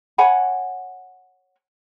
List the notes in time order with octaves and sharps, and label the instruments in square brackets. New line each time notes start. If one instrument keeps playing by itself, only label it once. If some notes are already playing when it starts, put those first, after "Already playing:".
[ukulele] C#5 F#5 G#5 B5